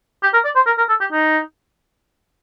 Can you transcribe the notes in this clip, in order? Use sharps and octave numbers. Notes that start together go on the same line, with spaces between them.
G4
A#4
D5
C5
A#4
A#4
A4
G4
D#4